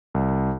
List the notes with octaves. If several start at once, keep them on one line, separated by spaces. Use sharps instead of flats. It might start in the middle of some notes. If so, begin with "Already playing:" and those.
C2